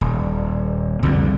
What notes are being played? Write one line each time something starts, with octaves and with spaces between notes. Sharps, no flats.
D#1
C2 F2 D3 G3